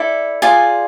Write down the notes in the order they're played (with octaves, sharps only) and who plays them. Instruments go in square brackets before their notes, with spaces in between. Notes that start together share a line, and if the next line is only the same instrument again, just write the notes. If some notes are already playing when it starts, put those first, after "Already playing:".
Already playing: [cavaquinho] E4 A4 D5
F4 G#4 D5 G#5